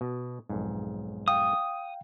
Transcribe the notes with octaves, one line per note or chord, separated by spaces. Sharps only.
B2
B1 F2 G#2
F5 G5 D#6